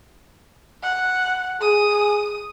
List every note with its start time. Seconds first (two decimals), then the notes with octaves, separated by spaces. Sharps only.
0.83 F#5
1.61 G#4 D#6